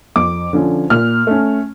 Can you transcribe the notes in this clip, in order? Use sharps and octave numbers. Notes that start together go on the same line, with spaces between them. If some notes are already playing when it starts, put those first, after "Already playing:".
F2 D6
D3 F3 C#4
A#2 F6
A3 C#4